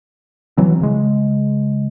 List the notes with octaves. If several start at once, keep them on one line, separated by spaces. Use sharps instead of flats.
E3 F#3 C4
C#3 G#3